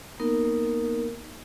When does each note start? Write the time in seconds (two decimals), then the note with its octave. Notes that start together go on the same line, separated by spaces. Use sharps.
0.20 A#3 B3 D#4 A#4